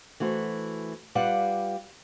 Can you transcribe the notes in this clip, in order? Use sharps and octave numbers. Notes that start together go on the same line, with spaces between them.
E3 A3 F#4 C5
G3 F4 B4 D5 F5 F#5